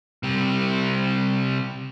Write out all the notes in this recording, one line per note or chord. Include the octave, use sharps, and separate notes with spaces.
C3 G3